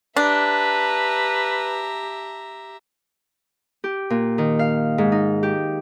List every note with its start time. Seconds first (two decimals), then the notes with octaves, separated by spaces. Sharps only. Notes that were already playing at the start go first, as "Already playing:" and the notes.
0.16 D4 G4 B4 E5 A#5
3.84 G4
4.10 A#2
4.38 D#3
4.59 F5
4.98 G#2
5.12 D#4
5.43 G4